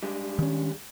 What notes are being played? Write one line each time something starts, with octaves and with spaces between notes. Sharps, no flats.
G3 G#3 D4
D#3 C#4